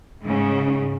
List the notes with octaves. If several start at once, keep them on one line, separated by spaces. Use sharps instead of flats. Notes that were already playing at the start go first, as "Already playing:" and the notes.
G#2 C#3